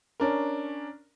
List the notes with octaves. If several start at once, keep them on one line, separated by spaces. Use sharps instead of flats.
C#4 D4 A#4